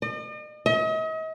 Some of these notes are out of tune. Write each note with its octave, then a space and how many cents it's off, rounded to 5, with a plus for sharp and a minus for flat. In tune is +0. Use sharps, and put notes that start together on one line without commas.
D#5 -45
D#5 +40